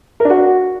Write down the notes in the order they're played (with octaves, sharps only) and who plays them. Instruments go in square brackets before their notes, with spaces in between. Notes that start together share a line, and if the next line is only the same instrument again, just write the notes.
[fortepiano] A#4
D4
F#4